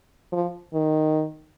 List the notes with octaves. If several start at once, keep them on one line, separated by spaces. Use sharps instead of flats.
F3
D#3